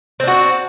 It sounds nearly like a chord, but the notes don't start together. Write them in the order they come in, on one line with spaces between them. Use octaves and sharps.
C4 D4 F#4